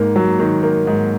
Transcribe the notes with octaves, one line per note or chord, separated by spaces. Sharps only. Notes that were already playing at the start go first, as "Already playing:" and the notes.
Already playing: G#2 A#3
F#3
D#3
A#3
G#2